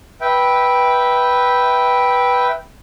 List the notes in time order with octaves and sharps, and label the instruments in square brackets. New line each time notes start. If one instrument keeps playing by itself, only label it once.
[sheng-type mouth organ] B4 E5 G5